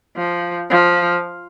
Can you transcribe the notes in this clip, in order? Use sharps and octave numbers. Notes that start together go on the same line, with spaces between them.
F3
F3